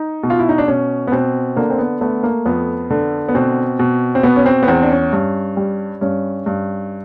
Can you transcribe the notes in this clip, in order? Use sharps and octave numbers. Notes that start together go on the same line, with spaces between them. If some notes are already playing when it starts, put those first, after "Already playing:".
Already playing: D#4
B2
F4
E4
D#4
D4
B2 C#4
B3
B2 C4
D3 A#3
C4
B3
A3 B3
A#3
F2 B3
D3
B3
B2 C4
B2
C4
B2 B3
C#4
C4
B3
E2 C4
D4
C#4
G2
G3
G2 C#4
G2